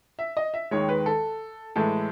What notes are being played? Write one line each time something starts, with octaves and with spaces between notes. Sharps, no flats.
E5
D#5
E5
D#2 D#3 G#3 C#5
B4
A4
A2 E3 G#3 A4